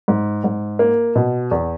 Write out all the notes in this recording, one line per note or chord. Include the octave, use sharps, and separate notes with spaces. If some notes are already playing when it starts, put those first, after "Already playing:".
G#2
G#2
A#3
B2
E2